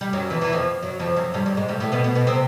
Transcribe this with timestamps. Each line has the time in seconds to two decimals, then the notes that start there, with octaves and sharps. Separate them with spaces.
0.01 G3
0.13 F#2 F#3
0.30 E2 E3
0.41 E2 E3
0.53 F2 F3
0.82 F#2 F#3
0.99 F2 F3
1.17 F#2 F#3
1.34 G2 G3
1.46 G2 G3
1.57 G#2 G#3
1.68 G2 G3
1.80 A2 A3
1.92 B2 B3
2.04 B2 B3
2.15 B2 B3
2.27 C3 C4